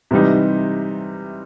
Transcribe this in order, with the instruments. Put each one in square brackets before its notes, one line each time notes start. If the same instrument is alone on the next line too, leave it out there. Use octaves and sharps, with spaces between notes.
[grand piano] C3 E3 G3 D#4